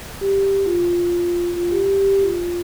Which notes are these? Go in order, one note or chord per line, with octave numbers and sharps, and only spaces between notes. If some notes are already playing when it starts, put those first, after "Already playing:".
G4
F4
F4
G4
G4
G4
F4